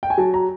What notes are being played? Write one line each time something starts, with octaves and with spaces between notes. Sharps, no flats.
G5
G#5
F#3 A5
A#5